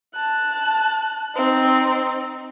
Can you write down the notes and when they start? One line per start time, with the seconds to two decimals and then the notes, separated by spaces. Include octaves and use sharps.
0.15 A5 F#6
1.36 C4 D#4